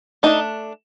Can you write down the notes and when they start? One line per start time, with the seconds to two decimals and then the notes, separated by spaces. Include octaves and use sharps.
0.23 A3 D4 D#4